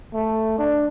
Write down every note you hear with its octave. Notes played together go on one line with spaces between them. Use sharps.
A3
D4